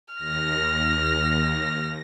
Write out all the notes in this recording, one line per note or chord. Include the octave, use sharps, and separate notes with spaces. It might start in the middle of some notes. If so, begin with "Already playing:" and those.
D#2 F6 A#6